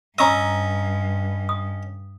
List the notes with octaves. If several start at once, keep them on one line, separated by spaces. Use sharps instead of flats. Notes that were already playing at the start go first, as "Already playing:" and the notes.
G2 C#4 D#5 A#5 C#6 E6
D#6